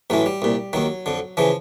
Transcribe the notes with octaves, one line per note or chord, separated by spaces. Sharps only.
A1 A2 E3 F#3
G3
C2 A#2
D#2 D#3 F#3
F2 D3
C#3 E3 F3